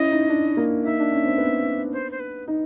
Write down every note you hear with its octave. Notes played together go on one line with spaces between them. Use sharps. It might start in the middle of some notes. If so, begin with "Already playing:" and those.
Already playing: C#4 E4 D#5
D#4
D4
A#3
D#4 E5
D4
C#4
C4
B3
C5
C5
B4
D#4